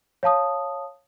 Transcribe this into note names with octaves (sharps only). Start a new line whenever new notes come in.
C#5 F5 A5 D#6